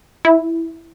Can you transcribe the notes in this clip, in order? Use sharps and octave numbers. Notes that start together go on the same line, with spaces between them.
E4